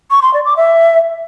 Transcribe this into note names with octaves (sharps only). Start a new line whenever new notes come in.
C#6
C6
D5
D6
E5